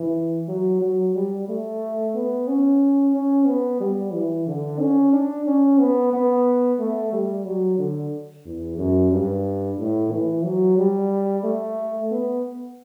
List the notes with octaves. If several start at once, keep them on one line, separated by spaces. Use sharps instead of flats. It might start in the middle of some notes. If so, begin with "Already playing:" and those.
Already playing: E3
F#3
F#3
G3
A3
B3
C#4
C#4
B3
G3
E3
D3
C#4
D4
C#4
B3
B3
A3
G3
F#3
D3
E2
F#2
G2
A2
E3
F#3
G3
A3
B3